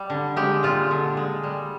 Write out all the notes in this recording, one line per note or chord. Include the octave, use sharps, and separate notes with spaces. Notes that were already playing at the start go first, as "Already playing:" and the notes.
Already playing: G3
D3
G#3 G4
A#2 F4
D3
G#3
G3